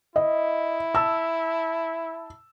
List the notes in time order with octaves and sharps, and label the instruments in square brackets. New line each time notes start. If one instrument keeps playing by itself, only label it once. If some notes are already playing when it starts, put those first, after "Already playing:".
[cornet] E4 [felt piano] D#5
[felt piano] A5 E6